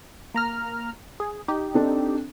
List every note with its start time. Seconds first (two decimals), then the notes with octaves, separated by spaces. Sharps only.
0.34 A#3 A#5 F6
1.20 G#4
1.48 D#4 G4
1.74 C4 D4 A4